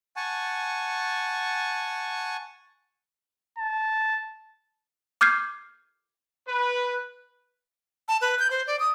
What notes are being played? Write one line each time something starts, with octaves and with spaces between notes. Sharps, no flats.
F#5 G#5 A5 C#6
A5
D6 F6 G6 G#6 C7
B4
A5
B4
G6
C5
D5
D#6